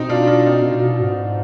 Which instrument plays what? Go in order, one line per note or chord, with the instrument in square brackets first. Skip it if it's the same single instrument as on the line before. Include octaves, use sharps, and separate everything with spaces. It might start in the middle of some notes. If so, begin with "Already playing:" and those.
Already playing: [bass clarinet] B2 [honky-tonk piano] C4 D#4
[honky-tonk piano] D4 F4
D4 F4
C4 D#4
[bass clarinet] B2
B2
G#2